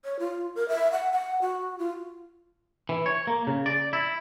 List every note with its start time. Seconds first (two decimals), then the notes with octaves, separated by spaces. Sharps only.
0.05 C#5
0.19 F4
0.56 A#4
0.69 E5
0.92 F#5
1.12 F#5
1.42 F#4
1.79 F4
2.89 E3
3.06 C#5
3.27 A#3
3.47 C#3
3.66 D5
3.93 E4